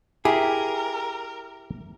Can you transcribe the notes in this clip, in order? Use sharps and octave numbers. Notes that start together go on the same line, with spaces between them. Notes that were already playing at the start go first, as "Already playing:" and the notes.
E4 G4 G#4 A#4